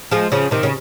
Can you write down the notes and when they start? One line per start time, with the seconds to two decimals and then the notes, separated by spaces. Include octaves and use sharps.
0.11 F3 G#3
0.32 C#3 F3
0.51 C3 D#3
0.63 C#3